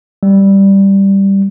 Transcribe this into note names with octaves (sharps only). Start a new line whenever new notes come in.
G3